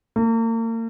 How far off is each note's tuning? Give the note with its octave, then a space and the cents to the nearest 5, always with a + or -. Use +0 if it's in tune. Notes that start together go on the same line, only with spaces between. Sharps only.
A#3 -40